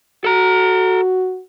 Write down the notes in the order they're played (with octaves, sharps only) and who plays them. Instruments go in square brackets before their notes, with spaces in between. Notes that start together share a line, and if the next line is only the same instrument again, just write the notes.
[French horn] F#4 [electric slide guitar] A4 A#5